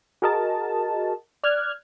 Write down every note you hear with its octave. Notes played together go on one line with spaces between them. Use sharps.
F#4 G#4 A#4 D#5 A5
D5 F6 F#6 G#6